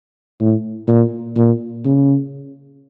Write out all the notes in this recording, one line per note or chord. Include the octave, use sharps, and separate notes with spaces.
A2
A#2
A#2
C#3